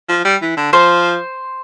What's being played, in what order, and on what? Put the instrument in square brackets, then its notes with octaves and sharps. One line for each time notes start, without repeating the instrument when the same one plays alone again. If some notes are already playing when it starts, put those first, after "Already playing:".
[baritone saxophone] F3
G3
E3
D3
[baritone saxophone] F3 [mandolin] C5